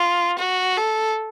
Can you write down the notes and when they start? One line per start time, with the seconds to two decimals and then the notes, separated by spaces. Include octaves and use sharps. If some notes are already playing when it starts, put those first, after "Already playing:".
Already playing: F4
0.39 F#4
0.77 A4